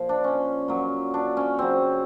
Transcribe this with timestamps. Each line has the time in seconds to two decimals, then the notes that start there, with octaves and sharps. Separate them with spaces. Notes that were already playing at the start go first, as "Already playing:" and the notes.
Already playing: A#2 F3
0.09 D4
0.24 C#4
0.68 A#2 F#3
1.14 D4
1.37 C#4
1.59 C#3 F#3 C4